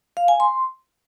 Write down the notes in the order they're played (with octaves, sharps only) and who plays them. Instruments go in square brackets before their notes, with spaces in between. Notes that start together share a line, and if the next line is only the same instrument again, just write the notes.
[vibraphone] F5
G#5
C6